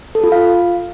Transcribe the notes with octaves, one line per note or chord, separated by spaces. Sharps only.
A4
F4
F5